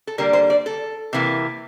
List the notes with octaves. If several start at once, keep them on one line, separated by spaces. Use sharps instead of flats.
A4
D3 G3 A#3 A#4
C5
D5
A4
C3 E3 A#3